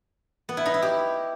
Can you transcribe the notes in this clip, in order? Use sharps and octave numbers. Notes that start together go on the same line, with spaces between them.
B3
E4
D#4
E4
G4